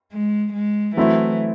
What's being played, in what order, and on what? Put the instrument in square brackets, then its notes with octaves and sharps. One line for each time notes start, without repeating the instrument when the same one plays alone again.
[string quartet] G#3
G#3
[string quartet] E3 [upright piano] F#3 A3 C4 E4